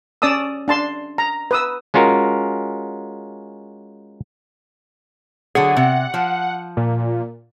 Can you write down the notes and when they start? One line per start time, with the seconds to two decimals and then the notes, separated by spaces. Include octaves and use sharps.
0.22 C#4 D5 A5 D#6 E6
0.68 D4 A5 C6
1.18 A#5
1.51 B4 D#6 E6
1.94 G#3 C#4 F4 F#4 A#4
5.55 D3 F#3 G#4 F#5
5.77 C3 F#5
6.14 F3
6.77 A#2